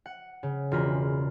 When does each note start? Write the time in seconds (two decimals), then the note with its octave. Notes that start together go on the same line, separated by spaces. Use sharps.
0.06 F#5
0.43 C#3
0.71 E1 F4 A#4 B5